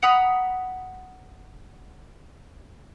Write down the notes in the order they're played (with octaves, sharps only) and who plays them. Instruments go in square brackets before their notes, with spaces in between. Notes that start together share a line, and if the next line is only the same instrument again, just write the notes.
[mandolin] F#5 A#5 B5 D#6